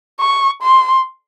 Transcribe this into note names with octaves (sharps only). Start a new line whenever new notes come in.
C#6
C6